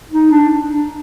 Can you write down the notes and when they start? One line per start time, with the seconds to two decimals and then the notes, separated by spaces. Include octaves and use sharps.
0.11 D#4
0.31 D4